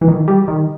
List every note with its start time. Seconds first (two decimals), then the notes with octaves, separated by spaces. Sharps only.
0.01 E3
0.08 D#3
0.28 G3
0.48 D#3